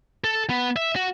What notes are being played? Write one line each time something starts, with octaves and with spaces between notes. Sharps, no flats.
A4
B3
E5
F#4